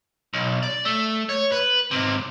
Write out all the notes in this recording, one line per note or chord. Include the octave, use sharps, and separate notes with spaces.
B1
D5
A3
C#5
B4
G#2 C3